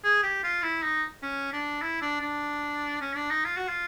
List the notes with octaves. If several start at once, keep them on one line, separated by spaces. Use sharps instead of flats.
G#4
G4
F4
E4
D#4
C#4
D4
E4
D4
D4
C#4
D4
D#4
F4
F#4
F4